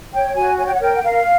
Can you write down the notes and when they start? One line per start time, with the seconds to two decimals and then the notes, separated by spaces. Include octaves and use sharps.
0.12 C#5 G5
0.35 F#4 G#5
0.57 C#5 G#5
0.66 G5
0.73 F#5
0.81 A#4 G5
0.95 F#5
1.03 A#4 F5